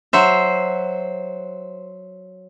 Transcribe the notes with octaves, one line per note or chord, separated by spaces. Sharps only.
F#3 C5 E5